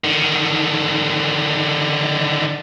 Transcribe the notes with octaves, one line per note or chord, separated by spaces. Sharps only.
D3 D#3